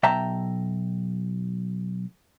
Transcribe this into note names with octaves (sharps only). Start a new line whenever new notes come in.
B1 E5 G5 A5 A#5